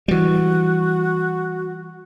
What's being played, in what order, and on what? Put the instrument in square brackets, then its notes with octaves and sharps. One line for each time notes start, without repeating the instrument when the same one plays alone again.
[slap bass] E3 G3 [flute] F#4